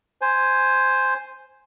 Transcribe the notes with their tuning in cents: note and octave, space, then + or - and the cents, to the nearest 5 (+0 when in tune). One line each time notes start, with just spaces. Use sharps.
C5 +0 G#5 +0